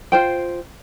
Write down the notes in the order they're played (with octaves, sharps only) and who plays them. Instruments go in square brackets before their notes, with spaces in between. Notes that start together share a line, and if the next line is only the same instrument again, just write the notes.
[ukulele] F4 C5 G5